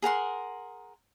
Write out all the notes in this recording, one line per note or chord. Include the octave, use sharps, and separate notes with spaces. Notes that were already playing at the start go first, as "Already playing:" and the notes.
G#4 A#4 F#5 C6